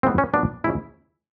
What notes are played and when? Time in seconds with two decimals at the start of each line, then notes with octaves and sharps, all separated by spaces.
0.03 C#3 E3 G#3 B3 C4
0.18 C#4
0.34 A#2 F#3 B3 D4
0.64 C#3 F3 G#3 E4